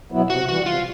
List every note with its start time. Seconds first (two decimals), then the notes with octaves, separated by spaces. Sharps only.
0.12 B2 F#3 B3 E4
0.30 C3 F#4
0.48 E3 G3 F#4
0.66 C3 F4